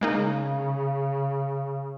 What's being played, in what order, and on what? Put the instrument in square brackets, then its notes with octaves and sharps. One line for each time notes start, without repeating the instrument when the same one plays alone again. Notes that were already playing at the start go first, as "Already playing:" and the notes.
[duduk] C#3 [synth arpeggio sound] G#3 A#3 D#4